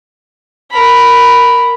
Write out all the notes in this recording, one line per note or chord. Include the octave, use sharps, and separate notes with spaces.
A#4 B5